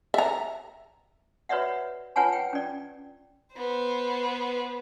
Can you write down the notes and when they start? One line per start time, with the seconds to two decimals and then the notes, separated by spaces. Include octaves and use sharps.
0.14 E5 A#5
1.49 F#4 B4 C#5 D5 E5 F#5
2.16 F4 B4 C#5 F#5 G#5 A5
2.33 G5
2.53 C#4 D5
3.56 B3 C5